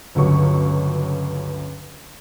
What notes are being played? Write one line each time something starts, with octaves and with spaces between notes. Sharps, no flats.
G1 C#2 F#3 C#6